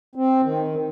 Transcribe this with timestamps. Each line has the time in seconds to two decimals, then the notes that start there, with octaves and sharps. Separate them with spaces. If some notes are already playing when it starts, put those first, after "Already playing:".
0.15 C4
0.44 D#3